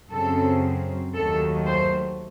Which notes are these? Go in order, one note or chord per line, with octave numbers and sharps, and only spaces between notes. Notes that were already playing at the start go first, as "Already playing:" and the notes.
F#2 C#3 F#3 C4 A4
D#2 D#3 F#3 A3 A4
C5